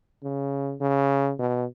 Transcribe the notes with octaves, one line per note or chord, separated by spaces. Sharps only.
C#3
C#3
B2